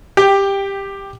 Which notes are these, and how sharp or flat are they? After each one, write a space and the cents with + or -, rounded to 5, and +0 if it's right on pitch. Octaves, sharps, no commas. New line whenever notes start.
G4 +10 G5 +0